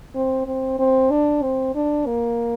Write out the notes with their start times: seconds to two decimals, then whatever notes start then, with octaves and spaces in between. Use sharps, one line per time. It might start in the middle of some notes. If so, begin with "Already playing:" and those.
0.15 C4
0.46 C4
0.79 C4
1.10 D4
1.42 C4
1.75 D4
2.06 A#3